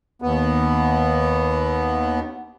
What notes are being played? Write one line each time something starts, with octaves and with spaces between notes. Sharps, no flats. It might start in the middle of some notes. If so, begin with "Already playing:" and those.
D#2 B3